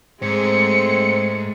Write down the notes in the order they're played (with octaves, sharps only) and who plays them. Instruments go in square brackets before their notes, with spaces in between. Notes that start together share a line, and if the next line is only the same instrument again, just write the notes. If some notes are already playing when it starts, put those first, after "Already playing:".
[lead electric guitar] G#2 [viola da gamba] G#3 A3 [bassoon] C4 [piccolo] C#7